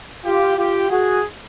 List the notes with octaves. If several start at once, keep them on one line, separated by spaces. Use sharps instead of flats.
F4 G4
F4 G4
F#4 G#4